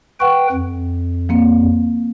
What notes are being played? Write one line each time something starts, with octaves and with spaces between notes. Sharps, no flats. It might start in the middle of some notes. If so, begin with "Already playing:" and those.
B4 F#5 G5 C#6
F2
F3 A#3 C4